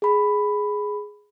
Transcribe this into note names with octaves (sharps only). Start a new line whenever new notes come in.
G#4 B5